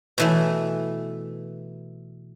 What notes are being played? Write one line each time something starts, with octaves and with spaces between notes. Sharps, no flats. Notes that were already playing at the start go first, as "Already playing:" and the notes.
B2 E3 A3